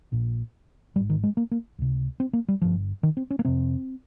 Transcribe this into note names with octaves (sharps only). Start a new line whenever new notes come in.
A#1 A#2
G#1 G#2 G3
D#3
G#3
A#3
A#3
C#2 C3
C4
A#3
G3
G1 G2 F3
D#3
C4
C#4
A#3
F1 F2 C3 C4